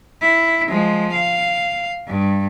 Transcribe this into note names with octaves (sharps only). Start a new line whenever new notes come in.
E4
F3 G#3
F5
G2